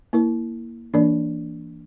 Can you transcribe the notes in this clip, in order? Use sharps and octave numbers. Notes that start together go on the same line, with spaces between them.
A#3 E4 A#4
E3 A#3 D4 A#4 D5